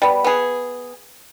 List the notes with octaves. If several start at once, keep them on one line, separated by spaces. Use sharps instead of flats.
G3 B3
B3 G#4